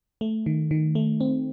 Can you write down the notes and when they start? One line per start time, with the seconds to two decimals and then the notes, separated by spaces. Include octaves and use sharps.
0.21 A3
0.46 D#3
0.71 D#3
0.95 A3
1.20 C4